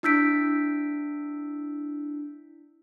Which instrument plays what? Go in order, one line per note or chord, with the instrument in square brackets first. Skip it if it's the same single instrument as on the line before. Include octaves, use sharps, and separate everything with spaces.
[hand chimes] D4 E4 E6 G6 B6 D7